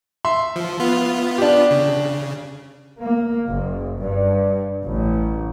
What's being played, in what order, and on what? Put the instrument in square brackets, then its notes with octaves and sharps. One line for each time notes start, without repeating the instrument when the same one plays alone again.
[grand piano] E5 C6
[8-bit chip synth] F3
B3 F4
[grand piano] D4 G4
[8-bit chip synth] C#3
[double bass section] A#3
F#1
G2
A1